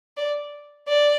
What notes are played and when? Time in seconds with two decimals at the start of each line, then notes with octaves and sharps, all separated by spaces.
0.17 D5
0.88 D5